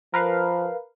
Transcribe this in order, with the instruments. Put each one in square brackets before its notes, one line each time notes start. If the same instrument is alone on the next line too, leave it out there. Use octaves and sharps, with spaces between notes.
[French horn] F3 [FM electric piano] A#4 B4 F5